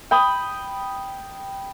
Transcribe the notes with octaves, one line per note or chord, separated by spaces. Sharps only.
G5 B5 D#6